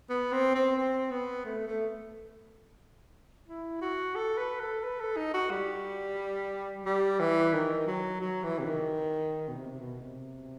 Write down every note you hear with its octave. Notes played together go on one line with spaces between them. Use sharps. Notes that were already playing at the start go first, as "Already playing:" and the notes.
B3
C4
C4
C4
B3
A3
A3
E4
F#4
A4
B4
A4
B4
A4
D#4
F#4
G3
G3
E3
D#3
F#3
F#3
E3
C3
D#3
B2
C3
B2
C3